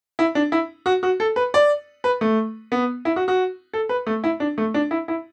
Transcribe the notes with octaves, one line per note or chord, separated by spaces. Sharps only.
E4
D4
E4
F#4
F#4
A4
B4
D5
B4
A3
B3
E4
F#4
F#4
A4
B4
A3
E4
D4
A3
D4
E4
E4